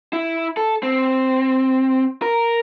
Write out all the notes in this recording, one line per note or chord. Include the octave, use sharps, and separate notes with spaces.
E4
A4
C4
A#4